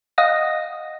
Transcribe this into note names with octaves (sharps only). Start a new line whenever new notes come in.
D#5 F5 F#5 D#6 A#6